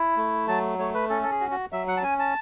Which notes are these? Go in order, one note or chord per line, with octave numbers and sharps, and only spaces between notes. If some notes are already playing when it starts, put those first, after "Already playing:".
Already playing: E4
A3
F#3 A5
A3 C#5
B4
C#4 A4
A4
G#4
F#4
F#4
F#3 E5
F#5
A5
C#4 G#5
A5